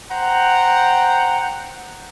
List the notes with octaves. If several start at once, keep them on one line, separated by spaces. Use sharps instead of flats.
C5 F#5 G5 A#5